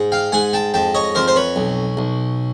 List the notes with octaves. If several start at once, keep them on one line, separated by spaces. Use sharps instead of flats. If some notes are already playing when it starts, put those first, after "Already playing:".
Already playing: G#2
F5 G5
G#2 F#5 G#5
G5 A5
F2 G5 A5
C#5 D#5
F2 A#4 C5
C5
B4 C#5
B1
B1